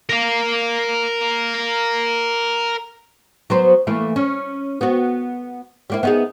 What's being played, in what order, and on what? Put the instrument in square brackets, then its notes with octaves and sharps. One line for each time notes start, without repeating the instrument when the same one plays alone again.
[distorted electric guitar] A#4 F5
[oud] F#3 B3 C5
E3 A3 A#3
C#4
B3 F#4
G3 A#3 E4
B3 D#4 G#4